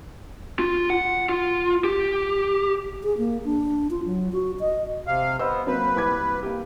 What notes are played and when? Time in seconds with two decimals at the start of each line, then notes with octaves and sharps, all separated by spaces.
0.59 F4
0.90 F#5
1.29 F4
1.84 G4
3.03 G#4
3.18 A#3
3.45 D4
3.91 F4
4.05 F#3
4.32 F#4
4.60 D#5
5.07 C3 F5
5.39 B3 C5 D#5 E6
5.67 F#3 A#3 C4 B4
5.96 C2 D6 G#6
6.43 A#3 G4